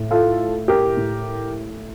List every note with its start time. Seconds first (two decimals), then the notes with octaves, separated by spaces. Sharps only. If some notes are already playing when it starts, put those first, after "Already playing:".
Already playing: A2
0.11 F4 A4
0.68 G4 A#4
0.97 A2